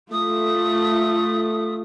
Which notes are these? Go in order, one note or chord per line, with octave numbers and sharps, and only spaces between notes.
A3 F4 D#6